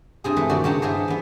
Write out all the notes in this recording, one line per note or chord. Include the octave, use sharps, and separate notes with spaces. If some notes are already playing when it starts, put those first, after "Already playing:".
G2 C3 G#4
E3 G#3 A3 B4 D#5
A#2 D#3 G3 F#4 D5
G2 C#3 G4 C#5 A5 A#5
B3 E4 G#4 C5 D5 D#5
E3 B3